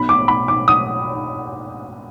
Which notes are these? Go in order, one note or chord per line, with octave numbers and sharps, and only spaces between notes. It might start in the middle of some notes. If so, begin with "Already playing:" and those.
Already playing: B1 B2 B5
D6
B5
D6
D#6